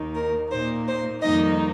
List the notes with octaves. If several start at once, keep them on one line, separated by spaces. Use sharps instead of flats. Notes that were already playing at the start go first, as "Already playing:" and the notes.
Already playing: D#2 D#3 A#3 D#4
A#4
A#2 A#3 D#4 C5
C5
F2 D#3 G3 A#3 D#4 D#5